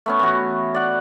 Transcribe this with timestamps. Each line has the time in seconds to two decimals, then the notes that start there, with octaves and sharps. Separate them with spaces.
0.06 A3 B3 C#4
0.19 E3 F#4
0.74 D5 F#5